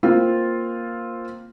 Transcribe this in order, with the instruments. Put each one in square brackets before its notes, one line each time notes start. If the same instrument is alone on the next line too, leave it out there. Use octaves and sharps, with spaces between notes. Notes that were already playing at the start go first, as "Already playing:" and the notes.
[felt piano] A#3 C4 F4